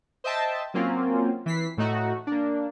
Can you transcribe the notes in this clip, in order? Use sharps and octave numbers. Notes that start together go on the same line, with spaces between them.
C5 D#5 E5 G5 A5
F#3 A#3 C4 C#4 F4
E3 B6 C7
A2 A3 D#4 F#4
A#3 D4